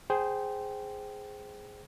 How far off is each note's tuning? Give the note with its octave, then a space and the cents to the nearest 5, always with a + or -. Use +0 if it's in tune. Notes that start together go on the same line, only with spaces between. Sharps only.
G#4 +0 C5 +0 G5 -20